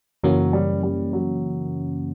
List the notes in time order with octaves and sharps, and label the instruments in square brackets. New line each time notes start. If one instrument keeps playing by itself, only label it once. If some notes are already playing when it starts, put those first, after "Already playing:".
[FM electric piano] F#2 C#3 E3 A#3 C#4 [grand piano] F#3
[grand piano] G3
G3
F#3